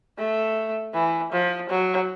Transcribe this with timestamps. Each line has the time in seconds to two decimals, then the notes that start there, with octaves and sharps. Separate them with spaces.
0.18 A3
0.94 E3
1.33 F3
1.70 F#3